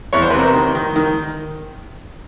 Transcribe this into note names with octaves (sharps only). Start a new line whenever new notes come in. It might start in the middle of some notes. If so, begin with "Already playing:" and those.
E2 C#5
C5
C3 B4
A#4 C5
D#3
D#3
D#3